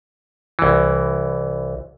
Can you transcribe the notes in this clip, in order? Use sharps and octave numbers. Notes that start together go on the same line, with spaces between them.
C2 E3